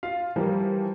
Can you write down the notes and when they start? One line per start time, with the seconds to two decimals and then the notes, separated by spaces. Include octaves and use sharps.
0.03 F4 F5
0.36 E3 F3 G3 A#4